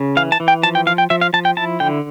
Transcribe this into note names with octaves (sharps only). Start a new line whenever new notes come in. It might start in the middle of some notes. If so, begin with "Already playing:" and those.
Already playing: C#3
E3 F5
A5
E3
G5
F3 A5
G5
F3 F5
G5
F3 E5
F5
F3 A5
G5
E4 A5
D3 G5